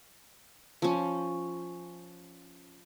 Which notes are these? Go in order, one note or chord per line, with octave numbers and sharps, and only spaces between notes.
F3 C#4